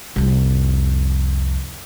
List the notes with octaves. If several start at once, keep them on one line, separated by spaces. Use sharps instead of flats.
C2 F2